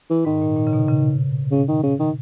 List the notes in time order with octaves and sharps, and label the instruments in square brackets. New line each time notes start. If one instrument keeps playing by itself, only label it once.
[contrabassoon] E3
[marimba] G#2 [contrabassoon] D#3
[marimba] A#2
A#2
C#3
B2
C#3
[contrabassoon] C#3
D#3
C#3
D#3